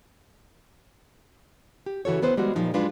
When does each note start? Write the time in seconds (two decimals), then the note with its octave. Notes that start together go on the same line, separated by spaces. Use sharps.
1.86 G4
2.05 C#3 E3 F#4 A4 C#5
2.22 E3 B3 B4 C5
2.37 G3 G#3 B3 F#4
2.56 A#2 F3 G3 D#4
2.74 F#3 G#3 D4 F4 F#4 B4